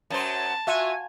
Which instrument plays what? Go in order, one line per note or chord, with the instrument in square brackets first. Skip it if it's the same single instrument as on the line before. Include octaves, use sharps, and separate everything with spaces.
[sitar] F#2 F#3 C5 [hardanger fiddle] A5
[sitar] F4 [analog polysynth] F#4 G#5 [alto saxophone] E5